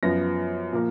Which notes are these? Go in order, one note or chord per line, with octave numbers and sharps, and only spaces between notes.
F#2 F3 B3 A#6
A#2 F3 A#3